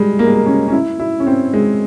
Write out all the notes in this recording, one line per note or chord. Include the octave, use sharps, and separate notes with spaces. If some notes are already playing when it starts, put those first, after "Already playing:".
Already playing: G3 G#3
A#3
G#3
A#3
C#4
C#4
E4
E4
C#4
C4
G#3